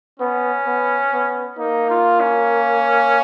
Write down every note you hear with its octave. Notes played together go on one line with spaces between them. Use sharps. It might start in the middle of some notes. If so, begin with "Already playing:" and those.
B3 C#4
B3
B3
A#3 D#4
F4
C#4